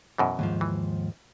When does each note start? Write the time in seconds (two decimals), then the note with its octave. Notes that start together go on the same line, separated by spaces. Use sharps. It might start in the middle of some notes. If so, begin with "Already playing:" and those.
0.18 F#2 B2 E3
0.39 D#2 G#2 F3
0.61 E3